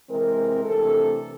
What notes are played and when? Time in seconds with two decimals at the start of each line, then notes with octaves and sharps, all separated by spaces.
0.09 C3 E3 G#3 C4 A#4
0.65 C3 E3 A3 D4 A4